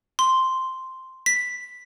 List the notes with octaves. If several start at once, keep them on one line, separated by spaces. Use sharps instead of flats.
C6
B6